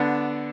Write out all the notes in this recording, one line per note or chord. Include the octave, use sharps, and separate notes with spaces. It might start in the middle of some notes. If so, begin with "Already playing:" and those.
Already playing: D3 B3 D4